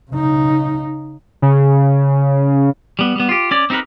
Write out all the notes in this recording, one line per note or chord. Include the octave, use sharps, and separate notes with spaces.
C#3 D#4
C#3
G3 B3
G3 B3
F4 G4
C#4 D5
C4 D#4 G4 A#4 B4